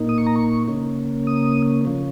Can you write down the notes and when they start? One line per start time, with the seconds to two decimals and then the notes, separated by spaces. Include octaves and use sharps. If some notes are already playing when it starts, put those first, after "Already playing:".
Already playing: A#2 A#3 D#4
0.09 D#6
0.18 C#6
0.26 A#5
0.36 C#6
0.68 C#3 A#3 C#4
1.27 D#6
1.85 C#3 F3 C#4